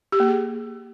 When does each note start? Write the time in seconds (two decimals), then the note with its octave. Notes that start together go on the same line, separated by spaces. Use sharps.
0.12 G4
0.20 A#3
0.27 G#4